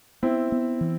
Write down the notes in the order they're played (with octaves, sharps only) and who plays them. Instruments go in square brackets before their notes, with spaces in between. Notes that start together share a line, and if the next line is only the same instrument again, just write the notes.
[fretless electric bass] B3 [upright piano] C4 E4
[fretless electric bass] B3
E3